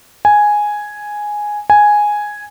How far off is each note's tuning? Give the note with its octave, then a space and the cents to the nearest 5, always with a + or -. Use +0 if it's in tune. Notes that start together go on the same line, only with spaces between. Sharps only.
G#5 +0
G#5 +0